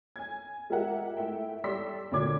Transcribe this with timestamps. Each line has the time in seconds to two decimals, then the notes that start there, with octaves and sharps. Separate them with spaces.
0.16 G#5 G#6
0.70 G#3 F4 G4 A#4 E5 F#5
1.16 A3 E4 E5 G5
1.64 G3 A4 D5 C6 E6 B6
2.11 D2 A#2 D3 D5 D6 G#6